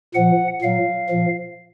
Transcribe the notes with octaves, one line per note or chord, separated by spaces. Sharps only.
A#2 F3 F#5
A#2 F#3 F5
A#2 F3